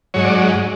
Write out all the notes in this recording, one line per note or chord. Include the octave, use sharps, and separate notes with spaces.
G#2 F#3 C#5
D5